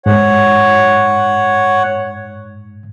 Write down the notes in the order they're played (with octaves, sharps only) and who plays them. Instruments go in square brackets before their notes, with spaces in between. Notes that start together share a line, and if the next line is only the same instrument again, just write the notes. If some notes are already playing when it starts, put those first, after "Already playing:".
[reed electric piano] G#2 [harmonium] C#5 F#5